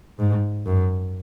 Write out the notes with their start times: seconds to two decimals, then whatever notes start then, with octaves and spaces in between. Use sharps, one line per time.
0.19 G#2
0.66 F#2